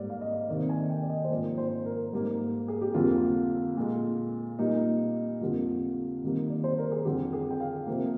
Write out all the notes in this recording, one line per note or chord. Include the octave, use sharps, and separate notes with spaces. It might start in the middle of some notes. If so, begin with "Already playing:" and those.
Already playing: G#2 G3 A#3 D5
F5
D#5
C3 D#3 A#3 D5
G#5
G5
D5
D#5
C5
G#2 F3 A#3 D5
C5
A#4
G#2 G3 A#3
G#4
G4
F2 D3 G3 A#3 F4
A#2 G#3
A#2 G3 A#3 D#4
F2 D3 G3 A#3 F4
C3 D#3 G3 A#3
D5
C5
A#4
G#4
F2 D3 G3 G4
G#4
G5
F5
C3 F3 A#3